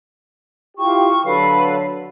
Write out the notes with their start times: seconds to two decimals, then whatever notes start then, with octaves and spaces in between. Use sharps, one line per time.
0.78 E4 F4 G4 C#6
1.24 D3 F#3 A4 B4 F5